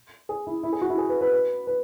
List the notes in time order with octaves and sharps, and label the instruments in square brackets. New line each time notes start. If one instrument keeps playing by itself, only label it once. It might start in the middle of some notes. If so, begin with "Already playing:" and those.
[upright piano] G#4
E4
E4
G#4
F#4
E4
G#4
B4
B4
B4
B4